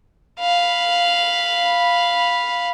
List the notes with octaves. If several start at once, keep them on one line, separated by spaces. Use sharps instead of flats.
F5 B5